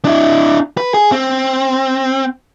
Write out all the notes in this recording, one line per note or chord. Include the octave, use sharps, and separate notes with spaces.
D4 E4
B4
G#4
C4